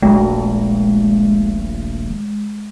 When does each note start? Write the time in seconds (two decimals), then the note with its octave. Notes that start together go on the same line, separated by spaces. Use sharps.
0.02 D#1 A#1 G#3 A3